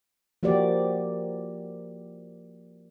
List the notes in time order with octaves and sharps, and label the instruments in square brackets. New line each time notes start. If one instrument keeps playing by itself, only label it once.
[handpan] F3 A#3 F#4 G4 D5